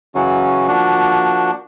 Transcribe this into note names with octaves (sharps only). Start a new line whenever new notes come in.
C#3 E3 F#3 C#4 F#4
F3 A#3 D4 F#4